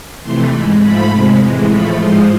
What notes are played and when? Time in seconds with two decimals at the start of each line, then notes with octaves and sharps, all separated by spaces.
0.22 F2 C3 E3 A3 C6
0.51 G#2 G#3 B5
0.81 G#2 F3 A3 B5
1.10 F2 C3 G#3
1.40 A2 E3 G#3
1.69 A2 F3 A3 B5
1.99 G#2 F3 G#3 C6